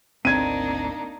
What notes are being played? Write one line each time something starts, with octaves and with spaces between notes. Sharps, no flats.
G#1 D2 A#3 C4 D4 D#4 G#6 D#7